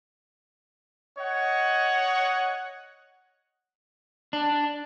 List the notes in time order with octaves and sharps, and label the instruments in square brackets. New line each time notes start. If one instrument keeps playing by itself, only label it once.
[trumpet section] C#5 D#5 F#5
[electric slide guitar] D4